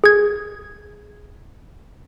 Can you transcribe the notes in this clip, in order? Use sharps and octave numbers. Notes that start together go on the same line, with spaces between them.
G#4 G#6